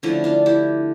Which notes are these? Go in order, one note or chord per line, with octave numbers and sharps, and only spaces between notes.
D3 F3 A3 C#4 E4
D4 F4
E4 G4